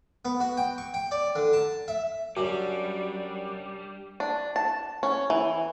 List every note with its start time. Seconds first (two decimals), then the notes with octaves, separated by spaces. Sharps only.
0.25 B3
0.40 F#4
0.57 G5
0.78 C#6
0.94 G5
1.11 D5
1.35 D3
1.53 A5
1.88 E5
2.37 F#2 G3 D4 F#4
4.20 D4
4.56 A5
5.03 C#4
5.30 E3